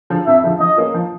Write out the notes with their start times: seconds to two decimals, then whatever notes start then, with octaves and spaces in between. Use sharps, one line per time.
0.10 D3 F3
0.27 F2 E5
0.44 D3 F3
0.60 F3 D#5
0.77 A#3 C#4
0.94 F3